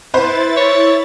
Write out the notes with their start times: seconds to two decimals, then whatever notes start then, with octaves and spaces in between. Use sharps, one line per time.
0.14 E4 B4 C5 A6
0.57 C#5